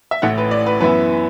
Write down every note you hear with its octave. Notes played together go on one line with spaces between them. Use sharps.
E5
A1 A2 A3 F#5
B4
D5
B4
F#2 E3 B3 E4 B4